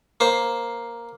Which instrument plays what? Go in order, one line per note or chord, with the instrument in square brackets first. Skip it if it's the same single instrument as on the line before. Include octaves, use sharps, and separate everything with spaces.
[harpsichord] A#3 C5